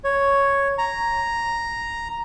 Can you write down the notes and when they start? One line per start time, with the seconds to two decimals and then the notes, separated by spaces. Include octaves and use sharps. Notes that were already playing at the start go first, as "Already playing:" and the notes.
0.04 C#5
0.78 A#5